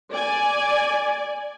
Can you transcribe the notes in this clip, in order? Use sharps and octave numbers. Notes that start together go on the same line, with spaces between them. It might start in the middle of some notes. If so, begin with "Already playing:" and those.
D5 G#5